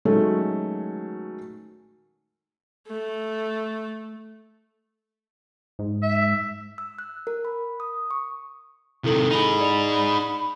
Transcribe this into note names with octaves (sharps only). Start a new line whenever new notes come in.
D#3 F#3 G#3 A3 C#4
A3
G#2
E5
E6
F#6
A#4
B5
D#6
C#6
C3 D#3 E4 A4 F#7
D#4 G#4 B5
D5 F7